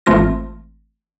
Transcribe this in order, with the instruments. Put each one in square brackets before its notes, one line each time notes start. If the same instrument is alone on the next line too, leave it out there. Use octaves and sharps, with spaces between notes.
[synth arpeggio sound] G#1 E3 A3 C4 F4 A#6